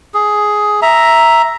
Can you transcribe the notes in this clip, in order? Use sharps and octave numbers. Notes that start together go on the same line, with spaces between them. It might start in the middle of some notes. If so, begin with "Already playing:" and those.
G#4
E5 A#5